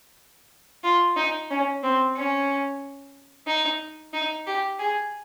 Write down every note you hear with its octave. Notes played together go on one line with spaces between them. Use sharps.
F4
D#4
C#4
C4
C#4
D#4
D#4
G4
G#4